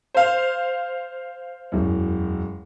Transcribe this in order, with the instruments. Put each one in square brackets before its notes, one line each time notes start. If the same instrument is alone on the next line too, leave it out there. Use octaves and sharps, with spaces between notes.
[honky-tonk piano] C5 F5
[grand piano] E1 F#2